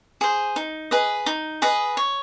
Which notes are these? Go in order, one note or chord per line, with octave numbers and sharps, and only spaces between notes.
G#4 C5
D#4
G#4 B4 D#5
D#4
G#4 B4 D#5
C#5